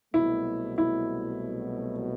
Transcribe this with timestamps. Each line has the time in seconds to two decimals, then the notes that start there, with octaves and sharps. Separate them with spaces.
0.14 C2 B2 F#3 A3 E4
0.78 E4